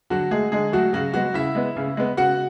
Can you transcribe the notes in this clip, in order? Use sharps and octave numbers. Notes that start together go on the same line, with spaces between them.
D3 F#3 F#4
G#3 A3 G#4
D3 G#3 G#4
F#3 A3 F#4
C#3 F#3 F#4
F#3 G#3 B3 F#4
C#3 E4 E5
G#3 B3
C#3
G#3 B3
C#3 F#4 F#5